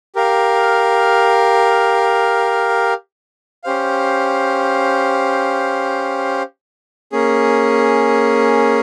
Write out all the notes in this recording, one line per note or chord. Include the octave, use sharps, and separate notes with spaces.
G4 A#4 F5
C#4 G4 C5 F5
A#3 C#4 G#4